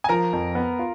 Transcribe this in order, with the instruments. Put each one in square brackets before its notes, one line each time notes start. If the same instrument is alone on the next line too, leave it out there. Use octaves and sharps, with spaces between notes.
[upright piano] G#5
[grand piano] F3 [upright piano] A#4 A#5
[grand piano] F2
B3
F4